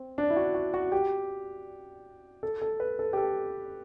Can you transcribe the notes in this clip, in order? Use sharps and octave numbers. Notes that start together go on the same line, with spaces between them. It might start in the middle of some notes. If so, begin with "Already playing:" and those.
Already playing: C4
D4
E4
F#4
F#4
F#4
G4
A4
A4
B4
A4
G4
A4